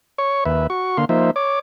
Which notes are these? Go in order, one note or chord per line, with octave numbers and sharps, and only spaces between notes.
C#5 C#6
D#2 B4 E5
F#4 C#6
D3 A#3 F5 C6
F3 A#3 D#4 C5 E5
C#5 D6